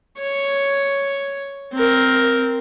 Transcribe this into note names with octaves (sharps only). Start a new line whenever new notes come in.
C#5
C4 A#4